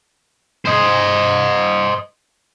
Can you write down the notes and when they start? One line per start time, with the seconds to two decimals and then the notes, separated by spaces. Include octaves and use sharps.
0.65 C5 D#5